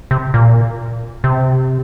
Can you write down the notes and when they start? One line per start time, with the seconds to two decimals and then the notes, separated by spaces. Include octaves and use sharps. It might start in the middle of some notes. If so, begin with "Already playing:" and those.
0.11 C3
0.34 A#2
1.24 C3